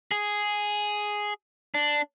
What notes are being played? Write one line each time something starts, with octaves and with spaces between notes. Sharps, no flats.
G#4
D4